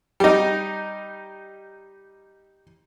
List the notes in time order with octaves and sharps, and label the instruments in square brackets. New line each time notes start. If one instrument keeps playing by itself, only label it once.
[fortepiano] G3 D#4